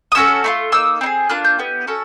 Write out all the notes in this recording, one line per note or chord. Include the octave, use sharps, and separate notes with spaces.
D#6
C#4 F#4 A4 E6
A3 D4 F4
A#3 D#4 E6
C4 D#4
G#4
A#3 D4 F4 F#6
G6
B3 E4 G4
C#4 F#4 A4